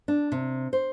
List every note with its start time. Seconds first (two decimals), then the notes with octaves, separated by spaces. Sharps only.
0.08 D4
0.32 C3
0.73 C5